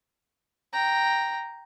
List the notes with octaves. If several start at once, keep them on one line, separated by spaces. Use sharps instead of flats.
G5 A#5